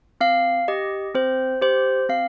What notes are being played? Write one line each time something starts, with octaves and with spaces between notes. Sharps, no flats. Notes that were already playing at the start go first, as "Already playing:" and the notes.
C4 F5
G4 D#5
C4 C5
G4 C5
C4 F5